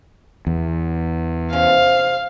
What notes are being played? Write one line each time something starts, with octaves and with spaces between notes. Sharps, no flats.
E2
C3 C#4 F5